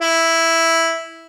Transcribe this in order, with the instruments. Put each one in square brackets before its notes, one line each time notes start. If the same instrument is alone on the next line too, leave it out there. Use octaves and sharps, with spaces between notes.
[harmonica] E4